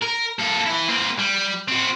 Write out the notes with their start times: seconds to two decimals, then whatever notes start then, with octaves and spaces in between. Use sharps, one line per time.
0.02 A#4
0.40 A#3 A4
0.67 E3 E4
0.89 A#3 C4
1.19 G3
1.68 C4 F#4